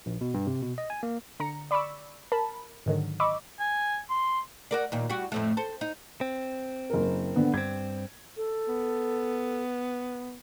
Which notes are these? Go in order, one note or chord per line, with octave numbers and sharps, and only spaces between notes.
A#1
B2
G2
C3
B2
D#5
G#5
A#3
D3 A#5 C#7
D5 B5 C#6 D6 E6
A#4 A5 B5
G#2 D3 D#3 F#3
D#5 B5 C#6 D6 E6
G#5
C6
F#4 A#4 D5
D#2 A#2
G3 F#4
F2 A2 A3
A4 C5
D#4
C4
F#1 A#4
D3 B3
G2 C4 G#6
A4
B3